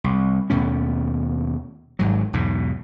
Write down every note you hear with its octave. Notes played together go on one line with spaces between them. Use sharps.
C2
D#2 B2 A3 C#4
G#1 G#2 F#3
B1 E2 G#2 B2